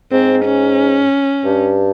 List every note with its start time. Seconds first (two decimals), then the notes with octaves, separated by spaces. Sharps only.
0.12 G#2 C4
0.45 C#4
1.45 G2